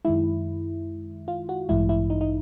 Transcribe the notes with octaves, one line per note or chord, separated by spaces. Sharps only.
F#2 D#3 G#3 E4
F4
F#4
A1 G2 E3 G#3 E4
E4
D#4
D#4